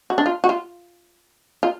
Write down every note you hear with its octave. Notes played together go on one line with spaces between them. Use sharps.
F#4
D4
F4
F#4
F4
F4